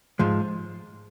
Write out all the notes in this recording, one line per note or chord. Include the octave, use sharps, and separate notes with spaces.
G#2 F3 G#3